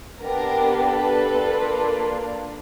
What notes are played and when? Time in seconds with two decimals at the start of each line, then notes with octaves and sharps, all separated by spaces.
0.21 B3 D4 G4 A#4
0.76 A4 B4
1.31 A#3 D4 F4